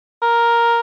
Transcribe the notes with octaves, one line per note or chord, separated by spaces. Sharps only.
A#4